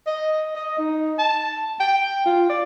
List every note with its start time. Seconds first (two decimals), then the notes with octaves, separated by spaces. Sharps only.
0.07 D#5
0.56 D#5
0.79 D#4
1.19 A5
1.80 G5
2.26 F4
2.49 D5